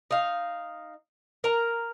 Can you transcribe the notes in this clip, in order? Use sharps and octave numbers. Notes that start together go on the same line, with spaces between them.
D#4 F5
A#4 A#5